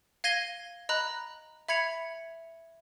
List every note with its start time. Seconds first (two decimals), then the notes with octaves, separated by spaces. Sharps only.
0.24 F5 G#6 A#6 D#7 G7
0.89 D#5 A#5 B5 F#6
1.68 E5 B5 G#6 C#7 F7